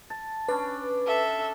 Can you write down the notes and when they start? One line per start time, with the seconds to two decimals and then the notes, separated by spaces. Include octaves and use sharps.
0.10 A5
0.49 C#4 D4 B4
1.07 A4 E5